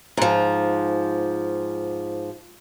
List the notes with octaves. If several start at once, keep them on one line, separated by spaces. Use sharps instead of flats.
G#2 F3